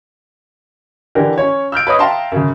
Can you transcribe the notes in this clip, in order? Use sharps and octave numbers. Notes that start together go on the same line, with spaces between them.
D3 E3 D4 G4 A#4
C#4 C#5
E6 F6 G6 D7
B4 C#5 D#5 D#6
E5 F5 G5 A5 A#5 C6
F#2 C#3